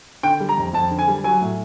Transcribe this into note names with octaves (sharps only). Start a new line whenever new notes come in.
D3 G5
G3
A#5
F2
F2 A5
D3
G#5
G3
F#3 G#5
A2